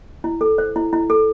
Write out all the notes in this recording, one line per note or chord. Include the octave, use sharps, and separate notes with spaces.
E4
A4
C5
E4
E4
A4